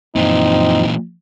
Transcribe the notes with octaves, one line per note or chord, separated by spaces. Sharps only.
F#2 A#2 E3 F3 C4 D#4